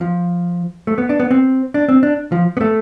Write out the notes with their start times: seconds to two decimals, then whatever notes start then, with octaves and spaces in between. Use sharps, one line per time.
0.01 F3
0.87 A3
0.98 B3
1.09 D4
1.20 B3
1.31 C4
1.74 D4
1.89 C4
2.03 D4
2.32 F3
2.57 B3
2.61 A3